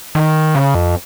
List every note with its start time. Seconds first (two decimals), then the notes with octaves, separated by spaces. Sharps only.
0.15 D#3
0.55 C#3
0.75 F2